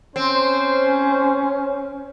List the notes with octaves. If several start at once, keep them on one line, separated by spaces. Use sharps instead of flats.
C4 C#4 C5